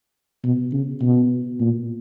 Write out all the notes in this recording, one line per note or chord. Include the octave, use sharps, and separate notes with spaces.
B2
C#3
B2
A#2